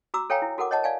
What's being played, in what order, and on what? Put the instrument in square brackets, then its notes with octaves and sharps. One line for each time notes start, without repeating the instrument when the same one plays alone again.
[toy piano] F#4 A#5 D6 E6
A4 C#5 F5 G5 G#5 A#5
E4
F#4 A4 A#4 F#5 D6
C#5 D#5 F#5 A5
D5 F5 G#5 A5